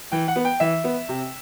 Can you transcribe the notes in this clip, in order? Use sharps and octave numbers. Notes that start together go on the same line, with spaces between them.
E3 G5
F#5
B3
G5
E3 E5
B3
C3